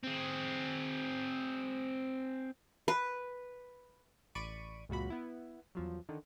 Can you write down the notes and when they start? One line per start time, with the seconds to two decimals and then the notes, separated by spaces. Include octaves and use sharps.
0.04 C4 G#4
2.88 B4
4.35 A1 D5 B5 C#6 D7 D#7
4.89 C#2 F#2 A#2 F#4 B5
5.10 B3 E4
5.75 E2 F3 F#3
6.09 D3 D#3